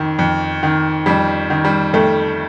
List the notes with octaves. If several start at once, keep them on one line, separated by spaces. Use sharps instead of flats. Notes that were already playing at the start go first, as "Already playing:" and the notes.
Already playing: F2 D#3
F2
D#3
F2 G3
D#3
G3
F2 A3